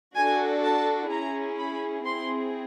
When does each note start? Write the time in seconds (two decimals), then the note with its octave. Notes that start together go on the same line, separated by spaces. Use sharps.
0.16 D4 F#4 A4 G#5
0.64 A5
1.11 C#4 E4 G#4 A#5
1.58 B5
2.05 C4 E4 G#4 C6